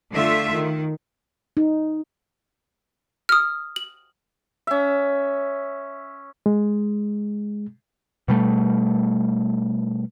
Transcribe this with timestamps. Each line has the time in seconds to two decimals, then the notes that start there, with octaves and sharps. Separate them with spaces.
0.11 D3 A3 F4 E5
0.54 D#3
1.57 D#4
3.29 D#6 F6
3.76 F#7
4.67 C#4 E5
6.46 G#3
8.28 B2 G3 A3